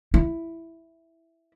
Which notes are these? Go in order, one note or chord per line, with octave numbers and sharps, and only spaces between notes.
E4